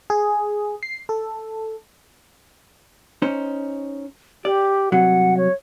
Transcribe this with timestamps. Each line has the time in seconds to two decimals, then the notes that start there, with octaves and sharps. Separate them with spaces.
0.10 G#4
0.83 C7
1.09 A4
3.22 C#4 D#4 C5
4.45 G4 D5
4.92 C2 C3 F#3 F#5
5.37 C#5